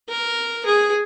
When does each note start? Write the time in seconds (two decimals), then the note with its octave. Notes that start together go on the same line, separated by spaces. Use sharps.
0.09 A#4
0.65 G#4